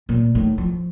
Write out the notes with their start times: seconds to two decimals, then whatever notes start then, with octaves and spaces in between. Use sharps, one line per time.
0.09 A#2
0.35 A2 D#3
0.58 F3